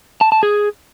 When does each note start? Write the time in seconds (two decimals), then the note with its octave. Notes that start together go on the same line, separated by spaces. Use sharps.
0.21 A5
0.32 A5
0.43 G#4